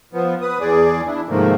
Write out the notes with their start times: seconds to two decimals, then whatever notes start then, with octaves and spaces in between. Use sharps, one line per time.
0.13 F3 B3
0.42 B4 D#6
0.60 E2 G#4 D5
1.07 D4 E4
1.29 G#2 C3 D#3 F3 A3 A#3